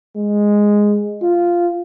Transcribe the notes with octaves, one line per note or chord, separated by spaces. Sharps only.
G#3
F4